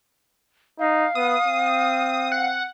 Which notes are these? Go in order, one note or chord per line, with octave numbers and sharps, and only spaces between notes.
D#4 F5
B3 D#6
C4
F#5